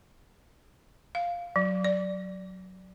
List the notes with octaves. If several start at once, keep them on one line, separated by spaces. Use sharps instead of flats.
F5
F#3
D5